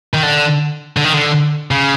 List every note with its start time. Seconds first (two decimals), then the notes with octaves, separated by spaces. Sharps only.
0.14 D#3
0.23 D3
0.97 D3
1.04 D#3
1.13 D3
1.71 C#3